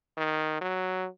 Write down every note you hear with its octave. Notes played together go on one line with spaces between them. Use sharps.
D#3
F#3